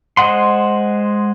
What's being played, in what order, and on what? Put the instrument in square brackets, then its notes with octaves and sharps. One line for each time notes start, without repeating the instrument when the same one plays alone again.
[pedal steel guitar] G#3 C5 D#5 F#5 C6